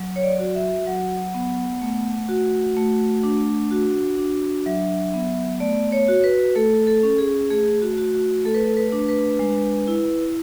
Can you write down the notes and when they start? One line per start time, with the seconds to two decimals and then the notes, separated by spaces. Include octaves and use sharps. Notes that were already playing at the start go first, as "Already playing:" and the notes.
Already playing: F#3
0.16 C#5
0.24 D5
0.39 F#4
0.55 E5
0.87 F#3 F#5
1.35 B3
1.82 A3
2.29 F#4
2.77 A3
3.23 D4
3.71 F#4
4.18 D4
4.66 F#3 E5
5.14 B3
5.60 A3 D5
5.92 C#5
6.08 F#4
6.24 B4
6.55 A3 A4
6.87 A4
7.03 C#4
7.18 G#4
7.50 A3 G#4
7.82 F#4
7.98 F#4
8.13 F#4
8.45 A3 A4
8.54 B4
8.64 A4
8.77 B4
8.92 D4
9.09 B4
9.39 G#3
9.88 E4